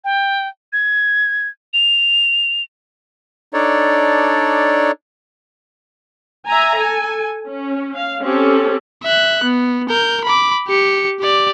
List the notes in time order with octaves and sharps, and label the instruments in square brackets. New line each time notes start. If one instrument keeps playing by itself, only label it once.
[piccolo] G5
G#6
F7
[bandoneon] D4 D#4 A4 C#5 D5
[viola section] E5 G#5 A#5
A4 G#5
C#4
F5
C4 C#4 G4 A4
[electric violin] E5 F#6
B3
A#4 G6
B5 D6
G4 C#7
G4 D5